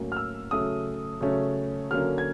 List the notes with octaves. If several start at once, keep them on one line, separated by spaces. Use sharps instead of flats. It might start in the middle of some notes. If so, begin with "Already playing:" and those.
Already playing: A2 F#3 A#3 C#4
F6
E6
C#3 F#3 A3 C#4 D#6
C#3 F#3 A3 C#4
D3 F#3 A#3 C#4 F6
G#6